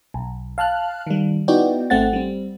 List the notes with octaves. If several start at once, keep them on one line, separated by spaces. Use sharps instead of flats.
B1
F5 A5 F6 F#6
D#3 G3
B3 D#4 E4 F#4 D5 G5
G#1 A3 C4 F#5 A6
G3 C4